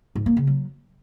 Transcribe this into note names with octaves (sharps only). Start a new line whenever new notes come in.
G#2
A#3
C#3
F#3